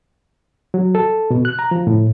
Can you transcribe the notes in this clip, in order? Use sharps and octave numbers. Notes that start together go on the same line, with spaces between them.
F#3
A4
B2
F#6
A#5
F3
A2